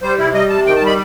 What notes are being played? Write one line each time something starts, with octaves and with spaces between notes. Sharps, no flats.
G3 C5
C3 E4
G3 D#5
C3 A5
D#3 G5
A5
G3 B5